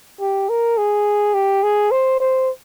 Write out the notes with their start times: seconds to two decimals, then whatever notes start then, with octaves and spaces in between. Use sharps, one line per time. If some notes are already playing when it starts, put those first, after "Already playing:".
0.21 G4
0.49 A#4
0.78 G#4
1.34 G4
1.63 G#4
1.91 C5
2.20 C5